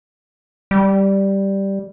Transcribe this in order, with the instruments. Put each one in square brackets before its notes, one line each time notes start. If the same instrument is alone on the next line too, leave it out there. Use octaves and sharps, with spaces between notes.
[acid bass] G3